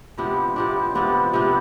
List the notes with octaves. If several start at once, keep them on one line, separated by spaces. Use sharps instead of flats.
C3 F3 B3 D4
C3 F3 B3 D4
C3 F3 B3 D4
C3 F3 B3 D4